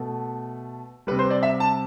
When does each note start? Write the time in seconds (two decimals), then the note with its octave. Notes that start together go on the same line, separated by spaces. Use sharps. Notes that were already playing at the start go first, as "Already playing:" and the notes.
Already playing: B2 A3
1.07 G3 B4
1.11 C3
1.19 C5
1.30 D5
1.43 E5
1.60 A5